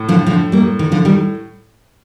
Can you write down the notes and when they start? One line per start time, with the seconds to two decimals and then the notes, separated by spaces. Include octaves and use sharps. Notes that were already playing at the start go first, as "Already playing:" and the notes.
Already playing: A2
0.09 D3 F3
0.27 D3 F3
0.52 G3 A#3
0.79 D#3
0.92 D3 F3
1.05 D#3 G3